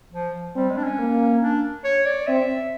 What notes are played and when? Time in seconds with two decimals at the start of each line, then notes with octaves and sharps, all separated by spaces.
0.12 F3
0.55 G3 C4
0.70 G#3
0.77 D4
0.84 C#4
0.99 A#3
1.42 D4
1.84 C#5
2.06 D5
2.27 C4 E5